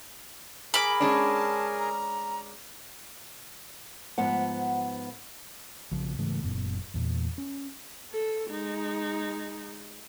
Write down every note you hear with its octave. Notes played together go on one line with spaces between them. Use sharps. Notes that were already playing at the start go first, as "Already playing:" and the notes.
G#4 A#4 G#5 B5 D6
G#3 C#4 D4 A5
A#5
G#2 F3 B3 F#5
A#1 C#3 F3
G#2 C#3 E3 A3
F#1 F#2 A#2 B3
E2 A#2
C#4
A4
G#3 D#4